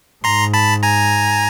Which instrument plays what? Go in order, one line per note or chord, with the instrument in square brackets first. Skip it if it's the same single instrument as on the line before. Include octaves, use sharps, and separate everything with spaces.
[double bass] G#2 [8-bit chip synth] A#5 C6
[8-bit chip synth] A5 B5
G#5 A#5